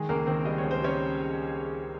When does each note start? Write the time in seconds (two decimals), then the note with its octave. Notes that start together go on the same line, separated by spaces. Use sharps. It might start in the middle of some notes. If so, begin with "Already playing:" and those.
Already playing: D#3 G#3 G#4
0.09 C#2 A#3 A#4
0.26 D#3 C4 C5
0.45 G3 D#5
0.58 C#5
0.64 C#2
0.71 C5
0.81 G3 C#4 C#5